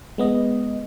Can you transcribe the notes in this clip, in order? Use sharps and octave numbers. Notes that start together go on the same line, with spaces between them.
G#3 B3 D#5